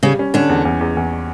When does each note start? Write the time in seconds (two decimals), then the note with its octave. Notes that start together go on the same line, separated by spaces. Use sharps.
0.03 C#3 G3 C#4
0.19 C#4
0.34 D3 C#4 D4
0.49 E2
0.65 E2
0.81 E2
0.97 E2